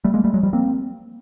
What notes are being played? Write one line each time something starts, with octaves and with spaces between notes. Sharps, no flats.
G3 A3
G#3 A#3
G3 A3
F#3 G#3
F3 G3
A#3 C4